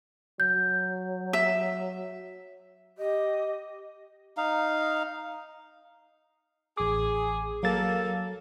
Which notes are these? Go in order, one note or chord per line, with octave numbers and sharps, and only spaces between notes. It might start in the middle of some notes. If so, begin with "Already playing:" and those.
F#3 G6
E5
G4 D#5
D#4 F5
A1 G#4 D6
F#3 A#3 A4 A6